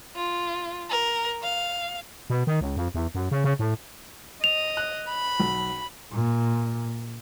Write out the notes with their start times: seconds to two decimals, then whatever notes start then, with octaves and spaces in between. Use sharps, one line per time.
0.16 F4
0.90 A#4
1.43 F5
2.30 B2
2.47 D#3
2.61 C#2
2.77 F2
2.95 E2
3.15 F#2
3.31 C#3
3.44 C#3
3.59 A2
4.44 D#5 F7
4.77 F#6
5.09 B5
5.40 B1
6.13 A#2